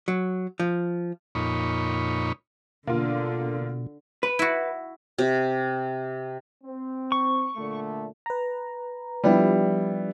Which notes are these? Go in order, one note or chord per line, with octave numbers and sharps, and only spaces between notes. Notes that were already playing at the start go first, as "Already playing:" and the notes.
F#3
F3
F2 A#2 D#4 C#5 B5
B2 D3 A#3 F4
B4
E4 F#4
C3
C4
C#6
A#2 D3 A3
B4 A#5
F3 G3 B3 D4 E4 G4